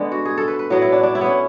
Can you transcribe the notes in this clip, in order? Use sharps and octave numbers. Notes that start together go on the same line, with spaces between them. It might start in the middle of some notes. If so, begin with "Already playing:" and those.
Already playing: D3 G#3 B3 D4
F#4
G#4
A4
B4
B4
A2 F#3 B3 F#4
E4
D4
D4
E4
B3 C#4